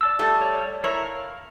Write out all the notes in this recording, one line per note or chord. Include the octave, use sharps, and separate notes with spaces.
D5 A5 E6
G3 A3
C#5 D5
E4 A#4 C#5 A#5
F5